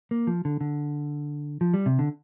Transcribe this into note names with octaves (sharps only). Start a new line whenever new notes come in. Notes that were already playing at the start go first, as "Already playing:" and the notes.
A#3
F3
D3
D3
F3
G3
C3
D3